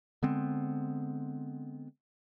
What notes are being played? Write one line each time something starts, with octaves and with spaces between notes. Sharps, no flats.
D3 G#3 B3 C4